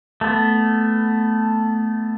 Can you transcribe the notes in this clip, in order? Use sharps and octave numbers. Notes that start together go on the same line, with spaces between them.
A3 B3